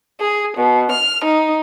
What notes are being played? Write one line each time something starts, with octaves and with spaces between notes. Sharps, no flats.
G#4
B2
F6
D#4